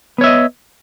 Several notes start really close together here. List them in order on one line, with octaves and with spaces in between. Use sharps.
B3 C#5 E5 D#5